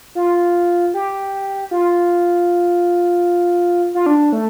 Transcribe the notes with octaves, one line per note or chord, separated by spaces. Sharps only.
F4
G4
F4
F4
D4
A3